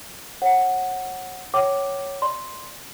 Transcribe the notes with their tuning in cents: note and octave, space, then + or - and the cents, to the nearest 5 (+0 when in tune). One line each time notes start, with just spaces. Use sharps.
C#5 -40 F#5 +0
C#5 +0 G5 -45 D6 +0
D5 +10 C6 +0